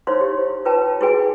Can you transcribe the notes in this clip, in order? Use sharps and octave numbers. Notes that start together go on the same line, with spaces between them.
D#4 E4 C5 C#5 F5 C6
G4
F4 B4 C#5 G5 A5 A#5
E4 F#4 G#4 B4 G5 G#5